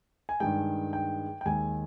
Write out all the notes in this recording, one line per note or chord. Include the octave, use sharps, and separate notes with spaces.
G#5
G2 D#3 G#3 G5
G5
G5
D#2 D#3 G#3 G#5